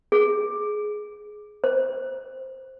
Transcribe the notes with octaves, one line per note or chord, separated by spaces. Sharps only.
G#4
C5